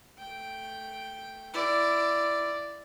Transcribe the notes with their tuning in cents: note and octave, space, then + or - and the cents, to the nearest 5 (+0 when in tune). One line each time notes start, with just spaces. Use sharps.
A3 -5 G5 +0
E4 +20 D5 +0